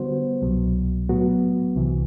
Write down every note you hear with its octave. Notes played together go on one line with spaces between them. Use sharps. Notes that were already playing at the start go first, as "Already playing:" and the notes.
Already playing: D3 G3 B3 F#4 C5
C2 B2 F#3
A2 F#3 B3 F#4
C2 C3 E3